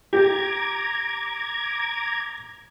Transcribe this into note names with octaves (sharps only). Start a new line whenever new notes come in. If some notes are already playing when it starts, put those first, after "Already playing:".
G4 A#5 D6 G#6